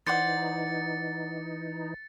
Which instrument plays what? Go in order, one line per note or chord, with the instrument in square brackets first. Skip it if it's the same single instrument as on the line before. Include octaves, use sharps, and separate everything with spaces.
[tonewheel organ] E3 D#4 [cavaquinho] C5 D5 F#5 [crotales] A6 C#7